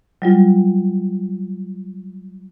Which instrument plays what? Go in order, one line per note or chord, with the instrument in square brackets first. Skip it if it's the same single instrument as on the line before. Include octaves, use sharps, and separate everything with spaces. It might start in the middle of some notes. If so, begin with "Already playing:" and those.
[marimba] F#3 G3 F4